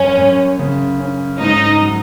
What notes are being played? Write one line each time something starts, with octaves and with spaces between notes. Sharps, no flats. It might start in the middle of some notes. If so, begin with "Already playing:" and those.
Already playing: F#2 C#4
F#2
C#3
C#4
G#2 D#4
F#3